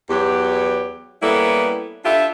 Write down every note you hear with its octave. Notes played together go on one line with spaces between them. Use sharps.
E2 F#3 G4
G3 A#3 B3 C#4 E4 A4
D4 F4 G4 A4 E5